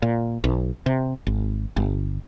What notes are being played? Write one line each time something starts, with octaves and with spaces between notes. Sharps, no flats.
A#2
B1
C3
G#1
G1